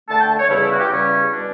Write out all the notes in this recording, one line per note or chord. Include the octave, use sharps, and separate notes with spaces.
D3 A3 D4 A5
G5
C#5
E2 C#3 G3 C#4 E4
E4
F#4
G4
E2 C#3 G3 C#4
B2 G3 D4